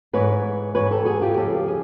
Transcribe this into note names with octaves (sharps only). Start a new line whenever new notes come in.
G#2 E3 B4 C#5
G#2 E3 B4 C#5
G4 A4
F#4 G#4
F4 G4
D#2 C#3 F3 G4 A4
G#4